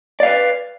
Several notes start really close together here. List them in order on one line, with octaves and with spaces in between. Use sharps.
D5 F5 B4